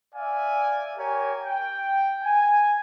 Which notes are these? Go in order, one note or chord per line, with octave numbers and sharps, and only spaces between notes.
D5 E5 F5 G#5
G4 A#4 C#5 G#5
G5
G#5